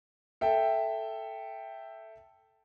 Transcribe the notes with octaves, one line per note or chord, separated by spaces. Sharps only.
A4 E5 G5